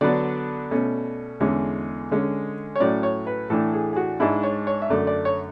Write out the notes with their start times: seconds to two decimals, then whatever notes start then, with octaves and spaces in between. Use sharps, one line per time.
0.01 D3 F#3 B3 D4 D5
0.71 B2 A3 C#4
1.40 E2 D3 G#3 C#4
2.11 D3 G#3 C#4
2.76 C#5
2.80 A2 F#3 C#4 D5
3.03 C#5
3.27 B4
3.50 A2 E3 A3 D4 A4
3.73 G#4
3.93 G#4
3.96 F#4
4.20 G#2 G#3 D4 E4
4.43 C#5
4.67 C#5
4.82 E5
4.90 F#2 D3 A3 D5
5.07 D5
5.25 C#5